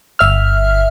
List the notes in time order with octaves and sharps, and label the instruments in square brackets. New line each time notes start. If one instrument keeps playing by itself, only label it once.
[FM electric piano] G1 E5 F6